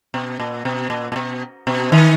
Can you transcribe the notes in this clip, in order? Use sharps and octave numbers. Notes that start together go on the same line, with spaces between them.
B2
A#2
B2
A#2
A#2
B2
B2
D#3